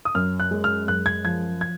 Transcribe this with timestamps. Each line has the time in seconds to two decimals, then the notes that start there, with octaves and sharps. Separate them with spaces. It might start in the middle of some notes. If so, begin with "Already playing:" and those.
0.05 D#6
0.15 F#2 F6
0.40 F#6
0.51 G#3
0.64 F6
0.87 F#2 F#6
1.06 G#6
1.24 F3 G#6
1.61 G#6